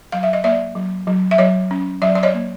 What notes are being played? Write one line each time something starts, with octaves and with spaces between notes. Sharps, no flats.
F#3 F5
E5
D#5
A#3 D5 E5
F#3
F#3
E5
F#3 C#5 D#5
C#4
F#3 D5 E5
D5
C#5 D#5
A#3